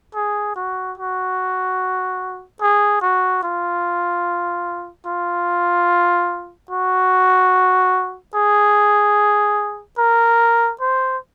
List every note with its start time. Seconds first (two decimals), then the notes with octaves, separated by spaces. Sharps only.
0.15 G#4
0.56 F#4
0.98 F#4
2.61 G#4
3.01 F#4
3.43 F4
5.06 F4
6.71 F#4
8.35 G#4
9.98 A#4
10.81 C5